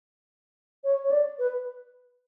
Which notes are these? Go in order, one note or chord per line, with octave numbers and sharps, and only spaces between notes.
C#5
C#5
D5
B4